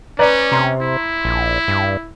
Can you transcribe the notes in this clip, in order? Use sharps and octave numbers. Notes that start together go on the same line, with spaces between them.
C#4 B4 D5 A#5
C3 A#5 C6
E4
A#1
G2